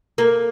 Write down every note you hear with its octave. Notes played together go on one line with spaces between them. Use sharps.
A#3